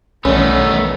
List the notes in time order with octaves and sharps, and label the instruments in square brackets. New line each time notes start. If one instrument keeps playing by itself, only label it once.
[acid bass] B1 [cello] D#3 E3 [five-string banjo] G3 C#4 [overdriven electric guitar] A3 B3